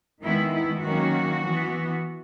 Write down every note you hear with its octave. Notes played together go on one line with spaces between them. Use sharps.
D#3 G#3 B3 E4
E4
D#3 F#3 A#3 C#4 F#4
E3 B3